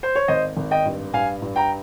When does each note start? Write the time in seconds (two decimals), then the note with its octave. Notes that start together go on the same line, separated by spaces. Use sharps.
0.03 C5
0.15 C#5
0.28 G#1 C5 D#5
0.57 G#1
0.71 D#5 G5
0.85 G2
1.14 G2 F5 G#5
1.42 G2
1.56 G5 A#5